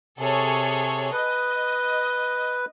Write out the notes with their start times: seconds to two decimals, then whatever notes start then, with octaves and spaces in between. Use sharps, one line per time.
0.19 C3 G#4 A4 C#5
1.12 B4 D#5